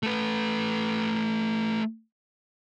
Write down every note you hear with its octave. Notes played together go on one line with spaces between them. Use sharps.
A3 B4